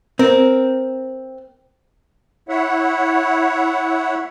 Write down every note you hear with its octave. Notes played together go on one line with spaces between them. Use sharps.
C4 A#4
E4 C#5 E5 F#5